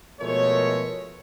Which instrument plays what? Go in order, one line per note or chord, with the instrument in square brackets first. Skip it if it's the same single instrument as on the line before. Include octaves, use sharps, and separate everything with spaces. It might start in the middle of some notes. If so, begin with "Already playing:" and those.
[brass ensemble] B2 F3 G#3 A3 A#4 C#5